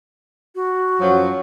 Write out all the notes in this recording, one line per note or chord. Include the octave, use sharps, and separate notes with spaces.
F#4
F#2 F3 F#3